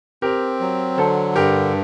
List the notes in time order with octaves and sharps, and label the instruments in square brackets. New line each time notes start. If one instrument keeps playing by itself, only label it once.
[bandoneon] C4 [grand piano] G4 A#4
[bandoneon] F#3
[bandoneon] D3 [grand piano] A4 C5
[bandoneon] G2 [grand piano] G4 A#4